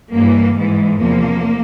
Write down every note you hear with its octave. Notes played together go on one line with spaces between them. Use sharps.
G2 E3 A#3
G#2 E3 G#3
E2 C3 F3 A#3